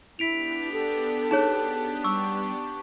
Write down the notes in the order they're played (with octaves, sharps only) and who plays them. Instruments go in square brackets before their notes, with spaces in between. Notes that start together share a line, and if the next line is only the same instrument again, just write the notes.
[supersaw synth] B3 D4 G4 [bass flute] E4 [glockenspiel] B6 D7 F7
[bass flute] A4
[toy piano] D#4 G#4 C#5 [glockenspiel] A5 F#6
[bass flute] G3 [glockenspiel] C#6 [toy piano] E6